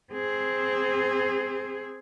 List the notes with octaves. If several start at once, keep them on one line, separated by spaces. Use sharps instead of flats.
C4 G#4